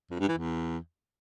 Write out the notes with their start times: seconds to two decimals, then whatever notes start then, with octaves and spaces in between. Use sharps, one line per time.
0.11 F2
0.20 G2
0.29 E3
0.37 E2